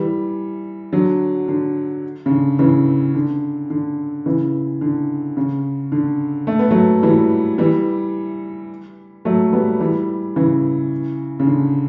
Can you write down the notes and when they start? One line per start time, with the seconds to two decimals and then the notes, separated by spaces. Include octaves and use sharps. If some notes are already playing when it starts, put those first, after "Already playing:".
Already playing: E3 G3
0.93 D3 F#3
1.48 D3
2.26 C#3
2.32 D3
2.59 C#3 E3
3.15 D3
3.70 D3
4.26 C#3 E3
4.81 D3
5.37 C#3
5.92 D3
6.47 A3
6.59 B3
6.71 F#3 A3
7.03 E3 G3
7.58 E3 G3
9.25 F#3 A3
9.53 G3 B3
9.80 E3 G3
10.36 C#3 E3
11.39 C#3
11.47 D3